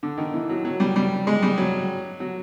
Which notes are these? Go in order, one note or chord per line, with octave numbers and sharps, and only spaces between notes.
D3
D#3
E3
F#3
F#3
G3
G3
G#3
G3
F#3
F#3